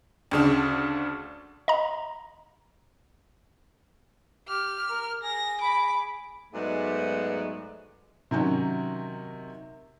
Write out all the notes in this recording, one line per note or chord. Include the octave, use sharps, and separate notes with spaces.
D2 C#3 D4
D#5 A#5
G4 F6
A#4
G#4 A#6
B5 D6
G#2 F#3 G#3 A3 B3 D5
C3 D#3 F#3 C#4